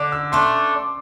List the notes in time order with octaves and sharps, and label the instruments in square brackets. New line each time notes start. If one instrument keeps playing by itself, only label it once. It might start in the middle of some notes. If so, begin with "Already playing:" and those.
Already playing: [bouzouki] D3 [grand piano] D6
[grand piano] E6
[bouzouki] A3 D4 [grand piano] C6